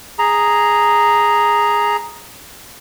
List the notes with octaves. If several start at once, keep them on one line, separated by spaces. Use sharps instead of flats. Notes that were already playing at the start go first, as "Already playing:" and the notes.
G#4 A#5